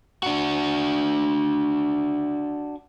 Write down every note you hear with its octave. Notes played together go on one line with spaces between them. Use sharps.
D4 F#4